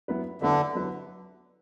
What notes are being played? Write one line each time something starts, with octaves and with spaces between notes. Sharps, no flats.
F#3 B3 E4 B4 E5
D3 F#3 B3 E4 B4 E5
F#3 B3 E4 B4 E5